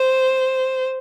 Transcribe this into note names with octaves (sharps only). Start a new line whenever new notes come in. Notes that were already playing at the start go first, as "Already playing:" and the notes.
Already playing: C5